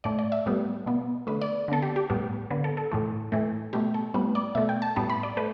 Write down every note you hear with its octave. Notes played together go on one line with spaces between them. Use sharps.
A2 A3 D5
D5
E5
A2 G3 B3
B2 B3
D3 A3 B4
D5
D3 B3 A4
G4
G4
A2 G3 B3
D3 B3
A4
A4
A2 E3 A3
A2 E3 A3
B2 A3 G4
A4
A2 G3 B3 B4
D5
B2 A3 E5
G5
A5
A2 G3 B3 A5
B5
D5
A3 B4